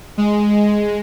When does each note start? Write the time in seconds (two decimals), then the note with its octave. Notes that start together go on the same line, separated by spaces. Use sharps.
0.18 G#3